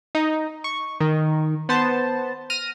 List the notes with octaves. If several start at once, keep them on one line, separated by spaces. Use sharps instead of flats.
D#4
C#6
D#3
B3 C5 A5
F6 A#6 D#7